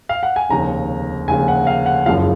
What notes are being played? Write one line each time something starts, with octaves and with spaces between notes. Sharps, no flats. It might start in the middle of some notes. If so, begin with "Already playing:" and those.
F5
F#5
G#5
F1 D#2 C#3 A#5
F1 D#2 C#3 G#5
F#5
F5
F#5
F#1 F#2 C#3 F3 F5